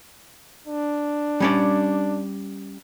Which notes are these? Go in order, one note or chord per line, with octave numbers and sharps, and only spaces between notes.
D4
G3 C#4 D5